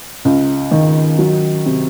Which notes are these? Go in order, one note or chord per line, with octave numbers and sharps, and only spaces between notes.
C#2
D#3
F#3
C3